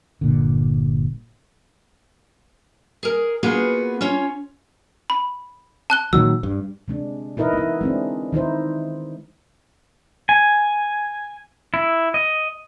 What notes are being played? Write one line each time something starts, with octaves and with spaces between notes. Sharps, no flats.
G1 A#2 D3
G#4 A#4
A#3 B3 F4 F#4 G#4 B4
C#4 F4 C#5
B5
A5 F#6 G7
A#2 D#3 F#3 E6
G2
C3 G#3 D4
D#4 E4 A#4 B4 D#5
B3 E4
G#3 C4 D4
D#3 D#4 E4 C5
G#5
E4
D#5